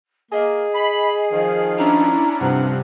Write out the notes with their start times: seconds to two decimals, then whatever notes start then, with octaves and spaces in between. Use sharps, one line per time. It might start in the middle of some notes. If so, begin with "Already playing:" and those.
0.32 A#3 G#4 D#5
0.75 B5 C7
1.32 D#3 F3
1.78 C#4 D4 E4 A#5
2.40 G2 C3 F3 C4 F#5